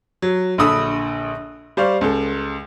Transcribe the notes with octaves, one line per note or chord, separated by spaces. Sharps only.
F#3
A#1 D3 A4 B5 D#6 E6
G3 C5 D5 F5 C#6
C#2 A4